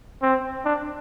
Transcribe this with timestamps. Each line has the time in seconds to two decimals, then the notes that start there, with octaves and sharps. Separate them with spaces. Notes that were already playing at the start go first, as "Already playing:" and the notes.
0.22 C4
0.65 D4